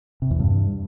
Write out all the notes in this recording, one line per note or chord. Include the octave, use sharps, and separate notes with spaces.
C3
E2
G2